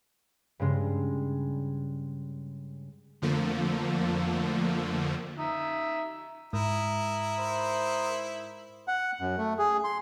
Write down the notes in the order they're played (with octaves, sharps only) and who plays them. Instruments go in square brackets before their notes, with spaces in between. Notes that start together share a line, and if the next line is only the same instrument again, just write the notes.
[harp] G2 C#3 G3 G#3
[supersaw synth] F2 D3 F3 A3 A#3
[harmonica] D#4 E5
[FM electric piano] G#2 [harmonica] E4 [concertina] A#4 D#6
[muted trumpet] C5
[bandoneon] F#5
F#2
A3
G#4
C6